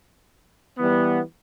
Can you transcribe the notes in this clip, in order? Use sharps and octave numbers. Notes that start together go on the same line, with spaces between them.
E3 G3 B3